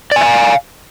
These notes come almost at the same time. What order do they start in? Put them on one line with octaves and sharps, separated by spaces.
D5 G#5 E5 F5